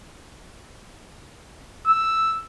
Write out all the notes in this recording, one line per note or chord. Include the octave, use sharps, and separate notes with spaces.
E6